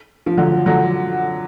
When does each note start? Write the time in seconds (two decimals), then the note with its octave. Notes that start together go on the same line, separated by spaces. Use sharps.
0.26 F3
0.37 D3 F#3
0.66 D3 F#3